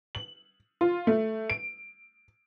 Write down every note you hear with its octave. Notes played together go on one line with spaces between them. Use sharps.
F#7
F4
A3
D7